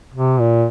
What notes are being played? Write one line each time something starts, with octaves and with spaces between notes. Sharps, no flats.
C3
A#2